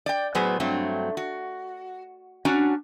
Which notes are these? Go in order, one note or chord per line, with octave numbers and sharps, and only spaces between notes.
D5 G5
A2 F#3 B3 G#4 B4 C5
G2 F#3 A3 C4
F#4
C#4 D4 F#4 G#5 A#5